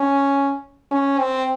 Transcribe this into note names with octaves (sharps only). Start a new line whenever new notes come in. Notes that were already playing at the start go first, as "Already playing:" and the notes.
Already playing: C#4
C#4
C4